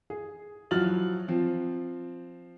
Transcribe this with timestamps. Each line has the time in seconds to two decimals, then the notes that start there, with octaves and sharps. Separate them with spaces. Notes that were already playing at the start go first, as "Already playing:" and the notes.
0.10 G#4
0.71 F3 F#3 E4 F6 A6 F#7
1.28 F3 C4